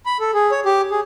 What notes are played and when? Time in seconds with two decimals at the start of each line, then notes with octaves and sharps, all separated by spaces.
0.06 B5
0.20 A4
0.34 G#4
0.51 C#5
0.65 G4
0.91 G#4